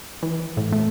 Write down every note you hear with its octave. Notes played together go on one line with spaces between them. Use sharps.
E3
A2
A3